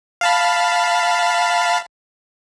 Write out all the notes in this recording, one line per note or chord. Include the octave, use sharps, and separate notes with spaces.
F5 A5 B5